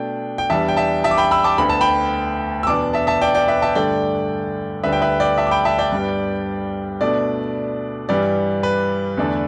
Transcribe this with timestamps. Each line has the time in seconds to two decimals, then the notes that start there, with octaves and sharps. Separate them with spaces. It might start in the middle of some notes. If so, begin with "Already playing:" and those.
Already playing: B2 A3 D4 G5
0.38 G5
0.50 E2 E3 G3 D4 E5 A5
0.68 G5
0.77 E5 A5
1.04 E5 A5
1.11 D6
1.18 G5 B5
1.31 B5 E6
1.44 A5 D6
1.58 D2 D3 B3 B5
1.69 A5
1.81 G5 B5
2.63 E6
2.67 E2 B2 B3 D4 A5 D6
2.93 E5 A5
3.07 E5 A5
3.22 D5 G5
3.35 D5 G5
3.48 B4 E5
3.62 E5 A5
3.75 G2 D3 A3 D4 D5 G5
4.83 D2 D3 G3 D4 B4 E5
4.93 G5
5.02 B4 E5
5.20 D5 G5
5.38 E5 A5
5.47 D6
5.51 G5 B5
5.65 E5 A5
5.78 D5 G5
5.92 G2 G3 B3 D4
7.01 B2 A3 D4 D5
8.09 G2 E3 G3 D5
8.63 B4
9.17 E2 D3 A3 D4